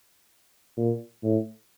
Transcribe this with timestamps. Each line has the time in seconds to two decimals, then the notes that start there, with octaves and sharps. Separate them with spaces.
0.77 A#2
1.23 A2